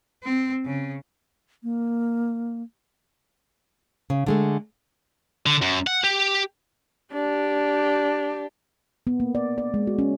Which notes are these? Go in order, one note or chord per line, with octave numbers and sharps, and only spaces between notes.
C4
C#3
A#3
C#3
D3 G#3 A3
D3
F#2
F#5
G4
D4 G4
B3
A#3
D5
D5
G#3
F#4
C#4